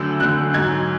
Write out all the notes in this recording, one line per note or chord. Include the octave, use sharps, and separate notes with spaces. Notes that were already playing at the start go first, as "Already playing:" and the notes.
Already playing: D2 D3 F#3 E6
D2 D3 F#3 F#6
G#2 F#3 G#6